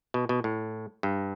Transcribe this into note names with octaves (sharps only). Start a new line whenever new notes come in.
B2
B2
A2
G2